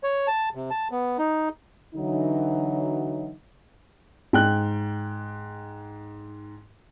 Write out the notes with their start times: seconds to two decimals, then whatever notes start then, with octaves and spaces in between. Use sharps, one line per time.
0.04 C#5
0.28 A5
0.55 C3
0.70 A5
0.91 B3
1.19 D#4
1.94 D3 E3 F#3 D#4
4.33 G#2 G5 F#6